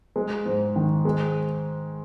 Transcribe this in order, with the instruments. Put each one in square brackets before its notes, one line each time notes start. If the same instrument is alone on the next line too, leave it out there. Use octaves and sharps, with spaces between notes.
[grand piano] G#3
G#2
D#3
G#3